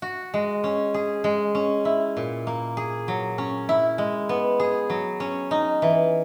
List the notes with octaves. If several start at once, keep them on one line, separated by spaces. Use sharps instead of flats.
F#4
G#3
C#4
G#4
G#3
C#4
E4
A#2
A#3
G#4
F#3
C#4
E4
G#3
B3
G#4
F#3
C#4
D#4
E3